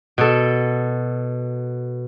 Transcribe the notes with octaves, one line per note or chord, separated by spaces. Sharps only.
B2 A4